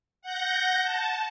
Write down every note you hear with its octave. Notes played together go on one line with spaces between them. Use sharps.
F#5 G6 A#6
A5